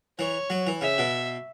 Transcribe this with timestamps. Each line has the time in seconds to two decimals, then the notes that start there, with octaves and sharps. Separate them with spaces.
0.19 E3 C#5
0.50 F#3
0.67 E3
0.81 C#3 E5
0.98 B2